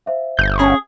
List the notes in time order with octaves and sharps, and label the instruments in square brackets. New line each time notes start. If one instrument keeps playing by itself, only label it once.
[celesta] C5 E5 F5
[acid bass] G1 [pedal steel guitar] G6
[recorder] C#4 [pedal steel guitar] G#4